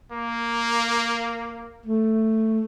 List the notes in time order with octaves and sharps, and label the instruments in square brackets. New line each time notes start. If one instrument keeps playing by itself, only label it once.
[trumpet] A#3
[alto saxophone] A3